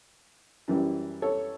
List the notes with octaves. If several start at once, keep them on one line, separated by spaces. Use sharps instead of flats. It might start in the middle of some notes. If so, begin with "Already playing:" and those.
F#2 E3 G3
A4 C#5